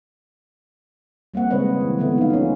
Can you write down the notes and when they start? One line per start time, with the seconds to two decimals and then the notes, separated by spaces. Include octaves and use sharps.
1.34 G3 A#3 C4 F#5
1.50 C#3 G#3 C4 B4 C#5 D#5
1.81 E3
1.98 D3 F3 A3 B3
2.18 D#4 F5
2.30 C#4 F4